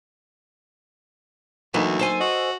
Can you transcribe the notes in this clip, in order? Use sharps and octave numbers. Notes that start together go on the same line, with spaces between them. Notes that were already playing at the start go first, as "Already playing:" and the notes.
D2 E3 F#3 A#3 D#4
A4 C5 G#5
F#4 D#5